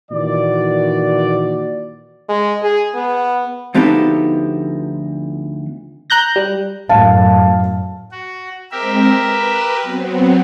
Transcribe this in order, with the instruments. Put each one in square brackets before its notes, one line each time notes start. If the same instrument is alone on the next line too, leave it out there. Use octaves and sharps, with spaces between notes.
[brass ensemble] A#2 D#3 E3 F#4 D5
[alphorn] G#3
G#4
B3
[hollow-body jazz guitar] D2 F3 B3 D#4 G4 A4
[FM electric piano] A#5 F#6 G6 A#6
G3
[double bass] F#2 A2 [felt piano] F5 A5
[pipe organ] F#4
[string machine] G#3 C4 [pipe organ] G4 A#4 E5
[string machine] B4
F#3 B3 C4